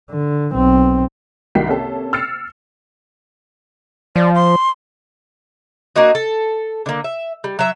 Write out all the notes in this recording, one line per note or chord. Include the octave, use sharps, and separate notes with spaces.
D3
B1 C4
C2 D#3 F#4 G5 B6 C7
C3 A#3 C#4 A4
E6 F6 A6 C7 C#7
F3 D5
C6
A#3 D4 F#4 D#5
A4
D3 A#3
E5
G3
F#3 E5